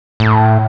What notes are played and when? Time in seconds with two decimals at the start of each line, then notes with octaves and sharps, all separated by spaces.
0.20 A2